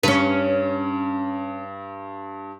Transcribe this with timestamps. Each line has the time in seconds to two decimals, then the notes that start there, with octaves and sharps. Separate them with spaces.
0.03 G2 C#4 B4